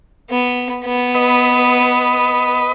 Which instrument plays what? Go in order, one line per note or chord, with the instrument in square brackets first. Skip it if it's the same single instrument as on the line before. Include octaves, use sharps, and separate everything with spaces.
[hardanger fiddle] B3
B3
[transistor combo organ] B4 D#5